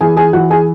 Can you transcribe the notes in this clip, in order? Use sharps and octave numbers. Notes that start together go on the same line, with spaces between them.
E3 G#4 G#5
G#4 G#5
E3 F#4 F#5
G#4 G#5